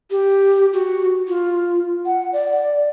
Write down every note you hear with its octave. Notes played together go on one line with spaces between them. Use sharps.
G4
F#4
F4
F#5
D5